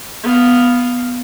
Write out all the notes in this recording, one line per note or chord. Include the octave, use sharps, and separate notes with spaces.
B3 F5